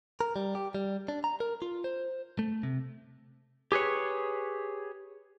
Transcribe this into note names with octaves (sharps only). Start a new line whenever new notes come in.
A#4
G3
G4
G3
D4
A#5
A#4
F4
C5
A3
C3
G4 G#4 B4 C#5